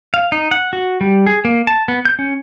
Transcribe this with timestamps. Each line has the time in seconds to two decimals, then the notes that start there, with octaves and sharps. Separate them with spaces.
0.14 F5
0.32 D#4
0.51 F#5
0.73 F#4
1.01 G3
1.26 G#4
1.45 A#3
1.67 A5
1.88 B3
2.05 G6
2.19 C#4